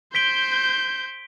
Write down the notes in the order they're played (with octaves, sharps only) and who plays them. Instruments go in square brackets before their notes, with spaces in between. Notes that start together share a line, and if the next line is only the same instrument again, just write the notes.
[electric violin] C5 G6 [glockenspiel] B6 D7 G7